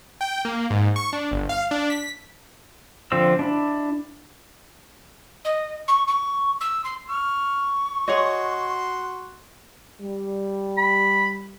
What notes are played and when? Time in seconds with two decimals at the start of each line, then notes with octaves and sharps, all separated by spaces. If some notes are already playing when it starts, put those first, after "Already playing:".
0.21 G5
0.45 A#3
0.70 G#2
0.96 C#6
1.13 D4
1.31 G1
1.49 F5
1.71 D4
1.90 B6
3.12 D3 F3 C4 E6
3.39 D4 E4
5.45 D#5
5.88 C#6
6.08 C#6
6.61 E6
6.84 C6
7.09 C#6 F6
8.08 F#4 G#4 C#5 D#5 C6
10.01 G3
10.78 B5